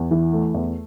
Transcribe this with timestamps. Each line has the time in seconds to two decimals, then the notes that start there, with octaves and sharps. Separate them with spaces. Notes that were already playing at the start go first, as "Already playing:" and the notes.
Already playing: E2
0.11 E3
0.33 A3
0.54 E2